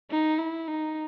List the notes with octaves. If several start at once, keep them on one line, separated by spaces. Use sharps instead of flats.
D#4
E4
D#4